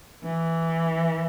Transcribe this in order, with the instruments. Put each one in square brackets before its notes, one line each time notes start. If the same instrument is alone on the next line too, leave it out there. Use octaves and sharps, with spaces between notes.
[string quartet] E3